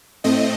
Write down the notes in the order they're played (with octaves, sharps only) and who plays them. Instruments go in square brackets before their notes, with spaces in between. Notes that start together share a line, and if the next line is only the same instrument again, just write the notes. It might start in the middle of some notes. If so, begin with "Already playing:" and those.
[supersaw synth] A2 A3 C4 D#5